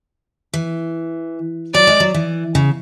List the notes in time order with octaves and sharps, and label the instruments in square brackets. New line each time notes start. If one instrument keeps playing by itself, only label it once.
[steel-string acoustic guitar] E3
[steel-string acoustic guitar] F#3 [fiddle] D5
[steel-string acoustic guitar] G#3
F#3
E3
C#3